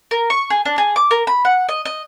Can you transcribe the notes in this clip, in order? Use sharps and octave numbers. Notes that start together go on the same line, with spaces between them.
A#4
C#6
G#4
D4
G#4
D6
A#4
B5
F#5
D#5
D#5